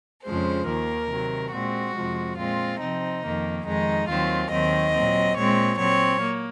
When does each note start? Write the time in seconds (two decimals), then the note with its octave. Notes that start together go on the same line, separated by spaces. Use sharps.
0.23 F2 C#3 F3 G#3 C5
0.66 D#2 D#3 A#3 A#4
1.09 C3 D#3 F#3
1.52 A#2 G#3 C4 F#4
1.94 F2 C3 F3 G#3
2.37 A#2 G#3 C4 F4
2.80 C3 F3 C4 D#4
3.22 F2 D#3 A#3
3.65 F2 D#3 G#3 D#4
4.08 D#2 D#3 F#3 C4 F4
4.51 D#2 D#3 F#3 C4 D#5
4.93 A#2 F#3 C4
5.36 A#2 G#3 C4 C#5
5.78 A#2 F#3 C4 C#5
6.21 A#3